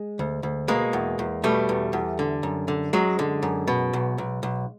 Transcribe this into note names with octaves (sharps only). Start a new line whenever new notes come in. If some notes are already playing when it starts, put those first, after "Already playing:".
Already playing: G#3
D2
D2
B2 G#3 A#3
E2
E2
B2 G3 A3
E2
E2
D3
F#2
D3
F#2 F#3 G#3
D3
F#2
B2
B1
B1
B1